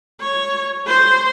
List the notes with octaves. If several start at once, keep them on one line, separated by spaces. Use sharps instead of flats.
C#5
C5